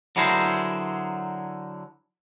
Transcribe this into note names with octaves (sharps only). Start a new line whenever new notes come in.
D3 F#3 E4 G#4 A#4 C5